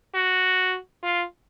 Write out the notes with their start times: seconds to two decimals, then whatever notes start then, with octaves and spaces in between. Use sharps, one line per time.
0.15 F#4
1.03 F4